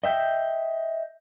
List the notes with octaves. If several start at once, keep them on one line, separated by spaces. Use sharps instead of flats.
D#5 E5 G5